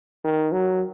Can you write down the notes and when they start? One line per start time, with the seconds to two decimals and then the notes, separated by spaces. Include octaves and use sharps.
0.24 D#3
0.52 F#3